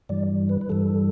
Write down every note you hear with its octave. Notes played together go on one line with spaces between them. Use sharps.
G2 E3 G3 D5
B4
B4
G2 E3 G3 A4